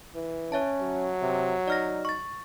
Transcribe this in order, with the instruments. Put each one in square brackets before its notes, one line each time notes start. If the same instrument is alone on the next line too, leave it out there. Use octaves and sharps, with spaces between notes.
[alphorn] E3
[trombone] C#4 [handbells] C#5 E5 A5
[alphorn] F#3
[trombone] C3
[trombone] D#4 [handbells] D5 F6 A#6
[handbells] C#6 A6